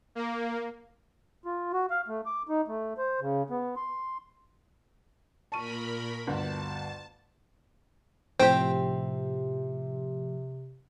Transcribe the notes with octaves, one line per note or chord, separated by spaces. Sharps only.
A#3
F4
F#4
F5
A3
D6
D#4
A3
C5
C#3
B3
C6
A#2 A#4 A5 B5 C#6 D#7
G1 D2 A5
A2 C3 F3 C4 G4 C5 G5